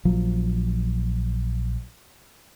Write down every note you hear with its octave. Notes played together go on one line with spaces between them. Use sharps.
A#1 F3 F#3